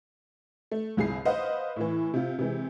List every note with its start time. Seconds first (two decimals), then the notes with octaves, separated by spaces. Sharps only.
0.71 A3
0.97 G1 C2 G#4 C7
1.25 B4 C5 D#5 F5 F#5
1.76 A2 E3
2.14 C3 F4
2.38 C3 E3 G#3